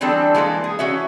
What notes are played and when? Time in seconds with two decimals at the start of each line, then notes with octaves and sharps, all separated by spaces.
0.01 D3 E3 G3 C4 D4 A4
0.35 E3 G#3 A#3 A4
0.64 G#4
0.79 E3 C#4 F#4 E5